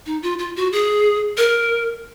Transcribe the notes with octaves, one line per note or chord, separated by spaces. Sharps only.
D#4
F4
F4
F#4
G#4
A#4